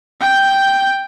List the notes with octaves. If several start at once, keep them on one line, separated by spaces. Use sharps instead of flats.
G5 G6